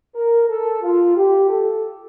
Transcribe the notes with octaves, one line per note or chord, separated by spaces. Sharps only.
A#4
A4
F4
G4
A4